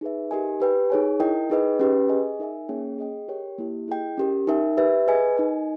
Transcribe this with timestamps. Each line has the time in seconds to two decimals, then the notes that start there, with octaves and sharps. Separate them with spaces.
0.01 D#4 G#4 B4 E5
0.31 D#4 G4 A#4 D#5 G#5
0.60 G4 B4 G5
0.90 D#4 G#4 C#5 G#5
1.20 E4 A#4 D#5 G5
1.50 D#4 G#4 B4 D#5 G5
1.79 C#4 G4 B4 G5
2.09 G#4 D#5 G#5
2.39 D#4 A#4 E5 G#5
2.69 A#3 C#4 G#4 C#5 G5
2.98 G#4 D#5 G5
3.28 G4 A#4 C#5 G5
3.58 A#3 E4 G4
3.88 E4 G#4 D#5 G5
4.17 C#4 G4 A#4
4.47 D#4 A#4 E5 G5
4.77 G4 B4 E5 G5
5.07 G#4 B4 D#5 G#5
5.37 D#4 A#4 D#5 G#5